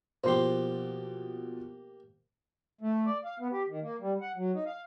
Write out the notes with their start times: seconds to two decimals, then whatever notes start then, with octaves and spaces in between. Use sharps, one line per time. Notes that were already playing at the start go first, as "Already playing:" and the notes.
0.24 B2 F3 A#3 G4 C5 C6
2.81 A3
3.06 D5
3.24 F5
3.39 B3
3.52 G4
3.69 D#3
3.82 A#3
4.00 G3
4.21 F#5
4.36 F#3
4.54 D#4
4.66 F5